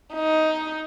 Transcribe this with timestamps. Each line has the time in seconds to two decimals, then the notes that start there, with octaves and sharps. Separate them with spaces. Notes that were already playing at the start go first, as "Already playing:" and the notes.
0.14 D#4